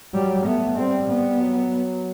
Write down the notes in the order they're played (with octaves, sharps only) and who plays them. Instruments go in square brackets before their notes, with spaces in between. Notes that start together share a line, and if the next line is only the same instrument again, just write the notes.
[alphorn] F#3 [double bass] G3
[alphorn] A3 [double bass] B3
[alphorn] G3 [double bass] C4
[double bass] B3
[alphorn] F#3